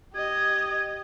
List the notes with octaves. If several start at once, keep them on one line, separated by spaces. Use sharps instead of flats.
G4 D#5 G#6